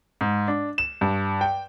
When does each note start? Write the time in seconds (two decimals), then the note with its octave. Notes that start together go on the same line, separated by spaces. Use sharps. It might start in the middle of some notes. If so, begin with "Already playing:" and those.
0.21 G#2
0.48 D4
0.78 E7
1.01 G2
1.41 G5